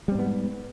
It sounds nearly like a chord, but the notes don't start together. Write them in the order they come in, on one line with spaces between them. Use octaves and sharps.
G3 C4 G#2 B3